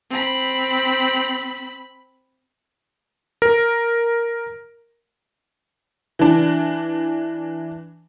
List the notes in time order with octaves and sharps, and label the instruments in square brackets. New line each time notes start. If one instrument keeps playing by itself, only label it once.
[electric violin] C4 B5
[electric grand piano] A#4
[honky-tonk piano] E3 D4